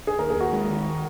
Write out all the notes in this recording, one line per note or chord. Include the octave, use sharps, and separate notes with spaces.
G#4
D#2 A#4
G#4
D#2 F#4
G#3
D#3